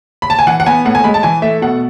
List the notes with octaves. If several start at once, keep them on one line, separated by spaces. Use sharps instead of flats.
B5
A5
G#5
E3 F#5
F#5
B3 G#5
A2 F#5
G#5
G#3 B5
A5
E3 G#5
A3 E5
B2 F#5